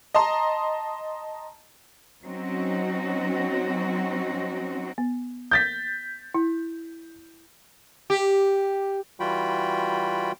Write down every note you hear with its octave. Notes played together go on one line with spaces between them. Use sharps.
D#5 A5 A#5 C6
F#3 C4 C#4 D#4 F#4
B3
G6 A6 B6
E4
G4
E3 G3 F4 F#4 G5 B5